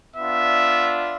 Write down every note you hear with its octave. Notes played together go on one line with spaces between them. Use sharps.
B3 D4 F4 E5